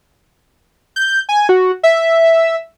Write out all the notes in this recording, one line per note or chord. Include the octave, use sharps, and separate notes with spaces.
G6
G#5
F#4
E5